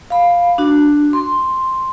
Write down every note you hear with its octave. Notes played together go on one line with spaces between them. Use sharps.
F5 B5
D4 F#4
C6